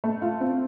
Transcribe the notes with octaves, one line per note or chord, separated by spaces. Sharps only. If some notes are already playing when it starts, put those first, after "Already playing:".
A3
F4
C4